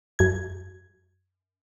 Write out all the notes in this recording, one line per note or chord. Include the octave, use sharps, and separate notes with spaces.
F#2 G#6